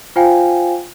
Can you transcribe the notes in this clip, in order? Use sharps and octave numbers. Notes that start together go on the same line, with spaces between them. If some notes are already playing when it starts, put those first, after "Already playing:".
F4 C5 F5 G5 G#5